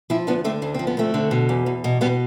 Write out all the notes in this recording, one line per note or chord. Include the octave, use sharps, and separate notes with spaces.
F3 C4 E4
D2 B3 D4
D3 A3 C4
D2 D4
F3 C4
B3
D2 A3 C4
D3
B2
E2
E2
B2
B2 G3 B3